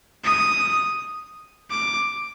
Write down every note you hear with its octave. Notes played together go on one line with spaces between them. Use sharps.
D#6
D6